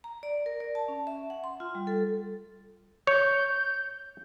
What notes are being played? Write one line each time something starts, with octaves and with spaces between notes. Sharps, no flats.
A#5
D5
A#4
D5
A5
C#4
E5
F#5
C6
F4
G3
A4
C#5 G6